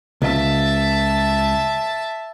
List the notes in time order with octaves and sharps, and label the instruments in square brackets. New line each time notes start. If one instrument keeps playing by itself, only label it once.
[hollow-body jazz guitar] C#2 [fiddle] E5 A5